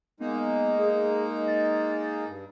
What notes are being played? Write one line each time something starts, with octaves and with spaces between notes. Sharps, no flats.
G#3 A#3 B3 D#4
G#4
A6
G2